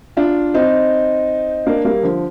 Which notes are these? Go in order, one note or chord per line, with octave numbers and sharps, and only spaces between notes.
D4 F4
C4 D#4
A#3 D4
G3 A#3
D3 F3